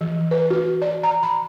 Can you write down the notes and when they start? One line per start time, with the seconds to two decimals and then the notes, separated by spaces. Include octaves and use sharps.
0.01 E3
0.31 B4
0.50 F#4
0.82 D5
1.03 A#5
1.23 B5